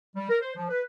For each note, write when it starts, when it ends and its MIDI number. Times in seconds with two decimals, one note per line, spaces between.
0.16 0.28 55
0.29 0.37 70
0.41 0.52 72
0.56 0.67 53
0.69 0.83 71